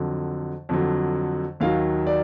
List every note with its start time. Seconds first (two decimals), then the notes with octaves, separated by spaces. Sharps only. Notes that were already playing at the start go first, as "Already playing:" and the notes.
Already playing: F2 D3 F#3
0.69 F2 D3 F#3
1.60 D#2 D#3 F#3 F5
2.07 D5